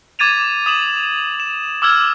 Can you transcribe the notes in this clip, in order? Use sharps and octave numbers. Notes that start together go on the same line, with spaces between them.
D6 G#6 A6 D#7 F7
D#6 E7 F#7
E7
D6 E6 F6 G#6